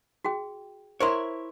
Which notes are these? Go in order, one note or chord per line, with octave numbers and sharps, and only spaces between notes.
F#4 G#4 G5
E4 A#4 C5 C#5 C6